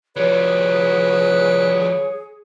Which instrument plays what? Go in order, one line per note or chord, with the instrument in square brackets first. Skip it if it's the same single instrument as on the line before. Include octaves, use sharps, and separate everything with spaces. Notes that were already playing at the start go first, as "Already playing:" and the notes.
[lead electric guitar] F3 G3 [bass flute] G#4 [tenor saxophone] B4 [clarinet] C#5